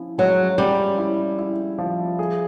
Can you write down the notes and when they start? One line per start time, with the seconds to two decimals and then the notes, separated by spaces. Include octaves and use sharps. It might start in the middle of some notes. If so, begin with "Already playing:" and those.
Already playing: F3 C#4 E4
0.18 F#3 G#3
0.58 G3 C#4
0.98 E4
1.39 E4
1.78 F3
2.19 G#4